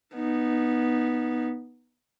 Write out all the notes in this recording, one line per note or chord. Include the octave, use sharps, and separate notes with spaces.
B3 D#4